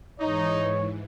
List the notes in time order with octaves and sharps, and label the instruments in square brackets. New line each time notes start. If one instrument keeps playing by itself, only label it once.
[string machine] G#2 E3 [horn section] D#4 [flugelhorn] C#5